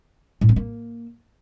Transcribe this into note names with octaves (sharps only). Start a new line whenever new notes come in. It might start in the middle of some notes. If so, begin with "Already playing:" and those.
A2
B3
A#3